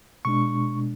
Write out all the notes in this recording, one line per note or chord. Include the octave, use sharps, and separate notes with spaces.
B2 G#3 D4 C#6